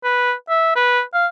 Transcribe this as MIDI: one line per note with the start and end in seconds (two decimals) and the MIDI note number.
0.04 0.33 71
0.50 0.73 76
0.76 1.02 71
1.14 1.27 77